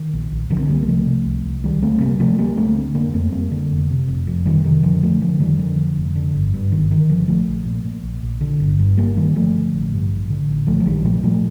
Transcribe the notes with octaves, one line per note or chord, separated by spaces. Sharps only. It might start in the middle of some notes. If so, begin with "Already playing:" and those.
Already playing: D#3
A#1
A#1
C2 D3 F3
C4
C2 G3 A#3
A#3
C3 F3 A3
C3
C2
C2
D2 D#3 G3
D2 A3 C4
C3 G3 A#3
C3 F3 A3
D2 G3 A#3
D2 A3 C4
D3
F1 A#3 D4
F2 A3 C4
F1 G3 A#3
D3
F1
C3
F1
F2
F1 D#3 G3
C3 D#3
F1 D3 F3
D3 F3 A3
F1 D3 F3
F2 D#3 G3
F1 D3 F3
D3
F1
D3
G1
G2
G1 D#3
D3 D#3
G1 D3 F3
A#1 F3 A3
A#1
A#2
A#2
A#1
A#1
D3
G1
G2
G1 G3 A#3
D3 D#3 G3
G1 F3 A3
D3
A1
G2
A1
D3
A1
A#1 F3 A3
F3
A#1 D#3 G3
A#2 F3 A3
G3
A#2 F3 A3